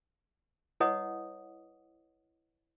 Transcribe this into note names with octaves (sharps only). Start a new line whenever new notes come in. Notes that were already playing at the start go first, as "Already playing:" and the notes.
E4 B4 C#5 D#5 F#5 D#6